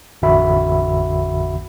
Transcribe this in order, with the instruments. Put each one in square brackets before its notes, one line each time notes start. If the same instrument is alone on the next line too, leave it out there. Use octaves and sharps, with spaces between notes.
[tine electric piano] A1 F2 D3 F#4 E5 B5